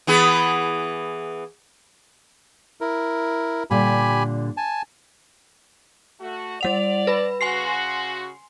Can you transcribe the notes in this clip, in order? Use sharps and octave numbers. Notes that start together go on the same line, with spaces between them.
E3 B3 G#4
E4 A#4
A#2 D3 G3 G4 G#5 B5
G#5 A5
A3 F#4
G3 D5 F#5 F7
B4 B5
C#3 F#4 G#5 C6 C7